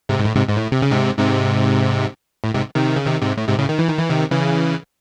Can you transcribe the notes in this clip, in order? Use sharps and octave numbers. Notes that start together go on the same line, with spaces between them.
G#2 C3
G#2
A2
G#2 C3
G#2
A2
C3
C#3
G#2 C3
G#2 C3
A2
G#2 C3
C3 D#3
C#3
C3 D#3
G#2 C3
A2
G#2 C3
A2 C#3
D#3
E3
D#3
E3
C3 D#3
C#3 E3